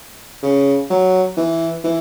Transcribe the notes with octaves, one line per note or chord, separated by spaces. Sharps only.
C#3
F#3
E3
E3